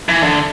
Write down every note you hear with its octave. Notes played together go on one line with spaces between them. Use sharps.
E3
D3